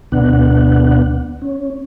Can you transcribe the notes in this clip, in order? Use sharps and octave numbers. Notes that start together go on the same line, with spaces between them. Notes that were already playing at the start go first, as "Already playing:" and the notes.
D2 B2 B3 D4 F#5
C#4